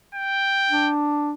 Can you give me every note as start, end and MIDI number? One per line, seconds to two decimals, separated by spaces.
0.15 0.92 79
0.70 1.33 62